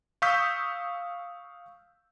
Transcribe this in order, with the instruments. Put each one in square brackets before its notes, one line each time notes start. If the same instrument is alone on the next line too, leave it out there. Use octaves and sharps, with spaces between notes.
[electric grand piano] F5 C#6 D#6 E6 G6 B6